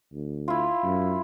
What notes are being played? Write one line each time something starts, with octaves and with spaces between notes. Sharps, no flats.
D2
E4 F4
F#2